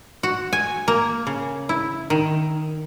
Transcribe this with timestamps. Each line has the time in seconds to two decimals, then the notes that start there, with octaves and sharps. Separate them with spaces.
0.23 F#4
0.53 G#5
0.88 A#3
1.27 C#3
1.69 E4
2.10 D#3